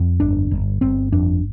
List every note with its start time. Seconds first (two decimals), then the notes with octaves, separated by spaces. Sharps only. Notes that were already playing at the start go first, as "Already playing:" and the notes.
Already playing: F2
0.20 G1 D4
0.51 G1
0.81 G1 C4
1.12 F2 D4